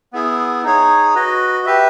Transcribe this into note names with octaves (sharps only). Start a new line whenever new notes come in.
B3 E4 G#4
D#4 G#4 C#5
F#4 B4 D#5
G4 B4 E5